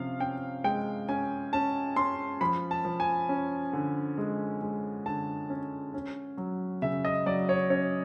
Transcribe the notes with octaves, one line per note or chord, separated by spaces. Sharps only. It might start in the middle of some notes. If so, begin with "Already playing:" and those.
Already playing: C3 F3 C#4 F5
C#4 G5
G#3 G5
C#4 G#5
C#4 A5
C#4 C6
F3 B5
A5
F3
G#5
C#4
D3
G#3
G#3
D3 A5
C#4
C#4
F#3
C#3 E5
D#5
F#3 D5
C#5
C#4 C#5